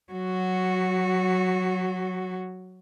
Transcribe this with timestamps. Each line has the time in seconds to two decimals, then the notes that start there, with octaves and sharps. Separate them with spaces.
0.13 F#3 F#4